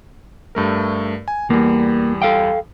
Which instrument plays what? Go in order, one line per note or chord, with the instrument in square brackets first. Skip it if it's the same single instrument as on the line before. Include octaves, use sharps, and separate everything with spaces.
[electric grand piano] G2 A3 A#4
G#5
[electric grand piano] E2 G3 [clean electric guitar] A#3
[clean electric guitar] A4 F5 G5